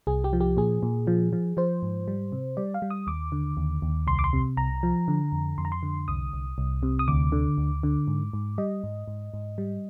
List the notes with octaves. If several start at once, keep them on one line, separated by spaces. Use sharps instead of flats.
C2 G#4
G4
F3
G4
A#2 G#4
A#2
F3
F3
F3 C5
G#2
G3
C3
G3 D5
F5
G3
D#6
D#2 D6
D3
D#2
D#2
C2 C6
D6
C6
C3
C2 A#5
F3
D3
F2
F2 C6
A#5
C6
D3
C2 D#6
C2
C2
C3
D#6
D2 D6
D3
D2
D3
G#2
G#2
G3 D#5
G#2
G#2
G#2
G3